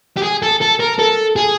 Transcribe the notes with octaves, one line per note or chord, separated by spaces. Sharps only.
G4
G#4
A4
A4
A#4
A4
G#4